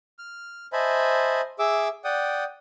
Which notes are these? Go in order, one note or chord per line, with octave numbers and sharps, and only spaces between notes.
F6
C5 D#5 E5 G#5 A5 B5
G#4 E5 D6 E6
D5 F#5 G5 D#6